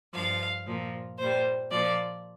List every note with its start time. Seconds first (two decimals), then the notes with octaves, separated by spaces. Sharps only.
0.13 G2 F3 F5
0.66 A#2 F3
1.18 A#2 G3 C5
1.70 A#2 F3 D5